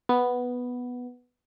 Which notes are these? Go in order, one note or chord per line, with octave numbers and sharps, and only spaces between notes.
B3